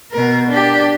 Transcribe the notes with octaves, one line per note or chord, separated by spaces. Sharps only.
B2 A#4
D4 G4